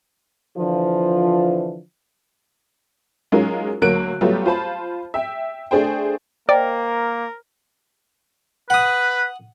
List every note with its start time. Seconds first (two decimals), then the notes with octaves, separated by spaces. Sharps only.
0.57 D3 E3 F3
3.32 F#3 G#3 C#4 D#4 F4 A#4
3.82 D2 F#3 A#3 F#6 D7
4.21 F#3 G3 A3 B3 F4 G4
4.46 F4 C5 A5 B5
5.14 E5 G5
5.71 A3 D4 G#4 C5 G5
6.49 A#3 A#4 C5 D5 D#5 G5
8.70 B4 F#5 D#6